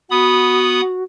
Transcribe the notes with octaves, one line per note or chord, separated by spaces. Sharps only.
B3 F#4 B5 D#6